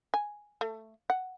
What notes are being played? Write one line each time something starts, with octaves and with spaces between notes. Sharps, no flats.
G#5
A3
F#5